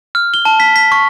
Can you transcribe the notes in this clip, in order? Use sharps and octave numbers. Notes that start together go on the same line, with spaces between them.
F6
G7
A5
B6
B6
C#6